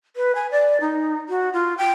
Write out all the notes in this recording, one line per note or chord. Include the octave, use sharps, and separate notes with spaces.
B4
G#5
D5
D#4
F#4
F4
G5